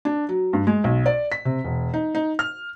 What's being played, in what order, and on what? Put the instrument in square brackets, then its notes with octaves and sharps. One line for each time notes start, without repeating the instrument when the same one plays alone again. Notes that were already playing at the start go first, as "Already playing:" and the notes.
[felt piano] D4
F#3
G2
G#3
B1
D5
B6
C3
E1
D#4
D#4
F6